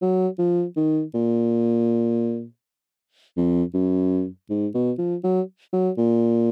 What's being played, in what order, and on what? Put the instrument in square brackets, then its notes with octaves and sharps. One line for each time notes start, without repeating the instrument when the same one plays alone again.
[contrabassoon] F#3
F3
D#3
A#2
F2
F#2
G#2
B2
F3
F#3
F#3
A#2